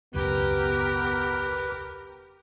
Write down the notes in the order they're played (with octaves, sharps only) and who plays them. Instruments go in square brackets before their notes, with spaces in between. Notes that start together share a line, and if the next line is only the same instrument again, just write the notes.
[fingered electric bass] E1 C#2 F#2 [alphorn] B3 [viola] G4 A#4 [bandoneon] B4